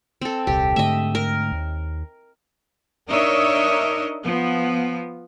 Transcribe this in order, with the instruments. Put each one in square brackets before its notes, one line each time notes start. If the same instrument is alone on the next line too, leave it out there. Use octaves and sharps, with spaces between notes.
[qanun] C4 A4
[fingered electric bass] D#1 C2 [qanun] G4
[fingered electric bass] G#2 D3 A3 [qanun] D#5 E5
[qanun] A#4
[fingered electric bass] D#2
[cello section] D4 D#4 A#4 C#5 D#5 E5
F3 B3